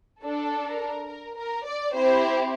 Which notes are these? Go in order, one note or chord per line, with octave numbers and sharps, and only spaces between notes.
D4 A4
A#4
A#4
A#4
D5
C4 E4 G4 C5